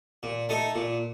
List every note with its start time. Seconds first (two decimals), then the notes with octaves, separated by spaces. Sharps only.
0.23 A#2
0.49 A3 D#4 A4
0.75 A#2